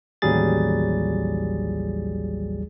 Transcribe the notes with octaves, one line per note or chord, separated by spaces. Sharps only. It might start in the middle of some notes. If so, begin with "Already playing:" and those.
A1 D#2 F#3 G3 G#4 A6